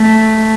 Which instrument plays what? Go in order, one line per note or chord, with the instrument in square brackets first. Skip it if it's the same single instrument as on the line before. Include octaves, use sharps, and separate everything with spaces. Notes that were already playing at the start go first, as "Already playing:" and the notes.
Already playing: [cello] A3